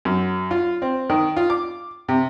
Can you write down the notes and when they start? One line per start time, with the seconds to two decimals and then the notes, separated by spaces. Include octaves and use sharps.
0.05 F#2
0.51 F4
0.82 C4
1.10 D#3
1.37 F4
1.50 D6
2.09 C3